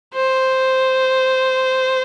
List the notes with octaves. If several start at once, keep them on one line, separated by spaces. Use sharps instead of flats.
C5